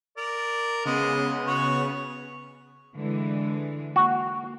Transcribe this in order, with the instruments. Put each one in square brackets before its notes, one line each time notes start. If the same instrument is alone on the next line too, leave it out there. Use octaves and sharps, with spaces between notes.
[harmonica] A#4 D5
[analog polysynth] C#3 B3 [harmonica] G#3
[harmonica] F#4 C#5
[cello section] D3 E3 G#3
[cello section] A#3 [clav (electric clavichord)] F#4